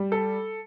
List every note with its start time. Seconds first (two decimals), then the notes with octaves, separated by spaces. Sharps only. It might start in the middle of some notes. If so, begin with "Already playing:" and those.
Already playing: G3
0.12 A4